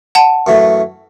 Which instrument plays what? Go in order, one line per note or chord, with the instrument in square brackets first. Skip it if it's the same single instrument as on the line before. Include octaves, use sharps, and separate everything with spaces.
[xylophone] F#5 A5
[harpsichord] F#2 E3 A3